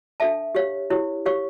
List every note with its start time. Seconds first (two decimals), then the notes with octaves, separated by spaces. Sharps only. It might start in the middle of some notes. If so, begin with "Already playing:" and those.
0.20 D4 A4 E5 A5
0.55 G4 C#5 F5
0.90 E4 G4 C#5
1.26 G4 C#5 F5 C#6